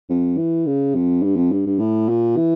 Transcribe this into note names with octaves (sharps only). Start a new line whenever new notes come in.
F2
E3
C#3
F2
G2
F2
G2
G2
A2
A#2
E3